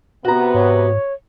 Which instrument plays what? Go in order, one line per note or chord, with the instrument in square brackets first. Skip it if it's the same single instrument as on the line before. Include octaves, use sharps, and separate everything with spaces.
[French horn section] C3 B3 [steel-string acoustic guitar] F#4 A#5
[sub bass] G#2 [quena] C#5